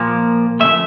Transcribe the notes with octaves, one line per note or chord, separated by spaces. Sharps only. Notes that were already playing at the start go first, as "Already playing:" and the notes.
Already playing: A#2 F3 A#3
C#3 F3 A3 E5